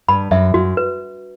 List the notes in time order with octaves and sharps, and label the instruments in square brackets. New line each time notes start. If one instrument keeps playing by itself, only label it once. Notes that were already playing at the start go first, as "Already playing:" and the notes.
[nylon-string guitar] G2 [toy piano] B5
[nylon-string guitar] F#2 [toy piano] E5
[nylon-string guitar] F#2 [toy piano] F#4
[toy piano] B4